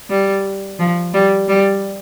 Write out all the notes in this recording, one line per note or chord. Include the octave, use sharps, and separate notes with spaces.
G3
F3
G3
G3